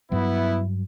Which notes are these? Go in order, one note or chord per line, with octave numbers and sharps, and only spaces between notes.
G2 F#3 B3 E4